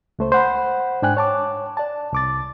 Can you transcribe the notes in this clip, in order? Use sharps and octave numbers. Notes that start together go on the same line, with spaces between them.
C#2 A3 C5
C5 F#5 B5
G#2 D4 G5 G#5 F#6
C#5 A5 D6
D5 A5
C2 D6 A6